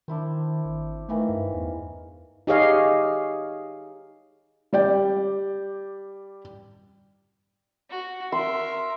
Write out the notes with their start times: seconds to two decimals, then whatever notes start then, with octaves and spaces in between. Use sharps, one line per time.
0.08 D#3 D4 E4 C5
0.65 G#1
1.09 D#3 E3 A3 F5
1.29 G2
1.54 E2
2.47 D#4 G4 G#4 C#5 D#5 F5
4.73 G3 D5 G5
7.91 F#4
8.32 A#4 E5 C6